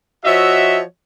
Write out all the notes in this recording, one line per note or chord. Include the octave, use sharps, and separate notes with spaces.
F3 F#4 C#5 D#5 E5